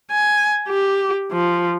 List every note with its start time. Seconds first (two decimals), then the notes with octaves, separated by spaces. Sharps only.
0.11 G#5
0.69 G4
1.32 F3